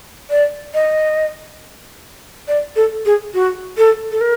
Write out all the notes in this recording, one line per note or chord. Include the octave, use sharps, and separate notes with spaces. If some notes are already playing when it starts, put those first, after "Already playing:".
D5
D#5
D5
A4
G#4
F#4
A4
A4
A#4